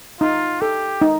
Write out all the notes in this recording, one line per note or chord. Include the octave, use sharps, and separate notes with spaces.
D#4 F4
G4 A4
D#4